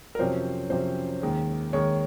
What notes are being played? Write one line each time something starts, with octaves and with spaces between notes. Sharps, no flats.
A#4
F2 C3 F#3 C#4 C5
F2 C3 F#3 C#4 C5
D#2 D#3 G#3
D#2 D#3 G#3 C#5